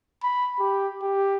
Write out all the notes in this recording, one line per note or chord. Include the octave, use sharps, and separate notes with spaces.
B5
G4
G4